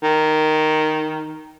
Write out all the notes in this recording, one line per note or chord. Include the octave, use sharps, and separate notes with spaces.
D#3